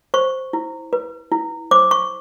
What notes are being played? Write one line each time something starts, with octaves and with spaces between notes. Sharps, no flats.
C5 C#6
E4
B4
E4
C5 D6
C#6